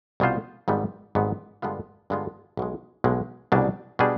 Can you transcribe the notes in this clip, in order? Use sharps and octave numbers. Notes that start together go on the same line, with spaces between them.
C2 B2 B3 F4 C5
G#1 G#2 G3 B3
G#1 G#2 G3 B3
G2 D3 G#3 B3 F4
G2 D3 G#3 B3 F4
B1 B2 G#3
B1 B2 G#3
C2 B2 G3 D4 G#4
B2 G3 D4 G#4